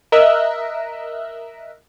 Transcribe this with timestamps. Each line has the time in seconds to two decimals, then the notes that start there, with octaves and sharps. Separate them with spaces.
0.12 A#4 D#5 E5 E6 F#6